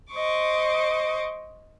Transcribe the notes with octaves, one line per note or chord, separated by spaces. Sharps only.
C5 D#5 C#6 D6